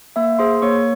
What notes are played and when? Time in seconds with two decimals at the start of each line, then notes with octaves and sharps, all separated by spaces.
0.16 A#3 E5
0.39 G#4 C5 C6
0.62 A#3 C#5 C#6